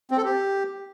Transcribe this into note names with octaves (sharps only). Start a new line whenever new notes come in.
C4
A4
G4